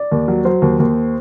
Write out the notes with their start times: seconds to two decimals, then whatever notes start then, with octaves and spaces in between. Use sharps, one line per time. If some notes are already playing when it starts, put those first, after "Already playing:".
Already playing: D5
0.12 D#2
0.28 F#3
0.45 F#3 C5
0.62 D#2
0.80 D#2